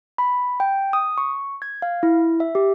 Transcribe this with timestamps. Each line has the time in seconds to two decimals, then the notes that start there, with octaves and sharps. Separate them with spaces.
0.18 B5
0.60 G5
0.93 D#6
1.18 C#6
1.62 G#6
1.82 F5
2.03 E4
2.40 E5
2.55 G4